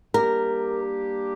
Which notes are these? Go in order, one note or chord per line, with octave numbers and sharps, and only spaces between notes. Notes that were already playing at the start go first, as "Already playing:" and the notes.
G3 A#3 D4 G4 A#4